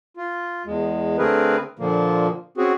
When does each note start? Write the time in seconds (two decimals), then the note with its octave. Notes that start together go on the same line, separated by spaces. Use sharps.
0.17 F4
0.66 E2 G#3
1.18 D3 A3 C4 G#4 A#4 B4
1.79 A#2 D3 F3 A#3
2.58 C4 C#4 F#4 G#4